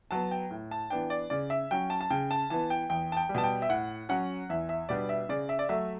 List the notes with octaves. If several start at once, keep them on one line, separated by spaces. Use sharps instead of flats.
F#3 B3 A5
G5
A2
A5
E3 B3 D4 G5
D5
C#3 D5
E5
F#3 C#4 G5
A5
A5
C#3 G5
A5
E3 B3 A5
G5
E2 G5
A5
G5
G3
B2 A5
G5
E5
A2 F#5
F#3 C#4 F#5
E2 E5
E5
B2 G3 B3 D4 D5
E5
C#3 D5
E5
D5
F#3 A3 E5